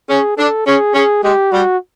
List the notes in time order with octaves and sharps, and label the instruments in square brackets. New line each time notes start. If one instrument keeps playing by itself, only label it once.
[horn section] C#4 [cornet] G#4
[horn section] D4 [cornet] A4
[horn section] C#4 [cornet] G#4
[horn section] C#4 [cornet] G#4
[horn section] G#3 [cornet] G4
[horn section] G3 [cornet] F#4